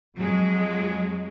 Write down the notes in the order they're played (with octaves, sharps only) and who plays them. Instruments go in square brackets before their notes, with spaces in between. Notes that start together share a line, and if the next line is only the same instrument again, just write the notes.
[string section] F2 F#3 G#3